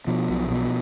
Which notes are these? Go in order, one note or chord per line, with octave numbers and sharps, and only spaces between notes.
B2 F3
B1
B2